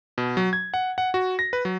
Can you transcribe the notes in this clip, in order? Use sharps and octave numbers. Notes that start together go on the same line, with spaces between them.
B2
F#3
G#6
F#5
F#5
F#4
A#6
B4
F#3